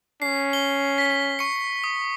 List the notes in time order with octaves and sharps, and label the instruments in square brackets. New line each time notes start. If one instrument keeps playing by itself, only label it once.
[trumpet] C#4 [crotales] C7
[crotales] G7
B6
C#6 C#7
D#6